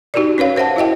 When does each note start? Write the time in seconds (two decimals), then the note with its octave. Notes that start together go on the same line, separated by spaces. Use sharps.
0.14 D#4 F#4 G4 A#4 D5
0.38 C#4 B4 C#5 F5
0.56 A#4 C5 E5 F#5 A5
0.76 E4 F#4 D#5 E5 G5